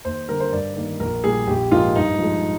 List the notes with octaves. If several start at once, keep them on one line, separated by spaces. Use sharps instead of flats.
D#2 C5
D3 G3 A#4
C5
G2 D5
D#3 A#3
A#1 A#4
A#2 G3 A#3 G#4
A#1 G4
G#2 F3 A#3 F4
G2 D#4
F3 G#3